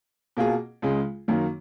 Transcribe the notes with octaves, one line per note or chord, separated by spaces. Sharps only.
B2 A#3 F4 G#4
C#2 C#3 G#3
F#2 D#3 F#3 A#3